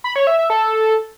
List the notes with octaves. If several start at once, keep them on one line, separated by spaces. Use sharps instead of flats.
B5
C#5
E5
E5
A4